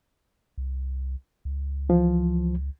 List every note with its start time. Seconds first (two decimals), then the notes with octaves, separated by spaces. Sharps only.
0.58 C2
1.45 C#2
1.89 E3 F3